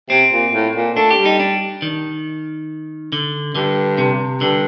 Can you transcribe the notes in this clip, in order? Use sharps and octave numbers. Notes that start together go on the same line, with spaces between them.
C3 C4
A#2
A2
A#2
A3 D4
G4
G3
D#4
D4
D#3
D3
G2 D3
C3
G2 D3